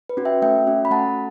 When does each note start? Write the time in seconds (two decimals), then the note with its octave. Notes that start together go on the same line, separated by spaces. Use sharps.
0.09 B4
0.17 C#4 F#4
0.25 E5 G5
0.42 A3 E5 G5
0.67 C#4 F#4
0.85 B5
0.91 A3 F#5 A5